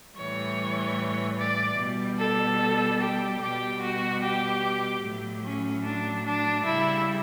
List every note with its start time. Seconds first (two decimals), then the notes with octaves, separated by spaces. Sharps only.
0.16 A2 E3 G3 C#5
1.37 D5
1.78 B2 G3
2.18 A4
3.00 G4
3.39 B2 G3 G4
3.80 F#4
4.22 G4
5.03 A2 F#3
5.43 C#4
5.83 D4
6.24 D4
6.65 C#3 G3 E4